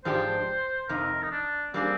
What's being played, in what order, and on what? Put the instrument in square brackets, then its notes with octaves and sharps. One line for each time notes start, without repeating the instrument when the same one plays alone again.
[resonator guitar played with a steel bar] G#2 F3 G#3 D4 G4 [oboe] C5
[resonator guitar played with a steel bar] F2 C3 D#4 [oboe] A#4
[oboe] D#4
D4
[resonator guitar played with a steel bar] G3 A#3 D4 G#4 [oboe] C4